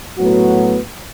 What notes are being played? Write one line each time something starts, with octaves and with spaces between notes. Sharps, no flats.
A2 F#3 B3 F#4